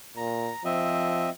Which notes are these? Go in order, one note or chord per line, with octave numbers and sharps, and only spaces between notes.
A#2 A#5
F3 C4 D#5 E5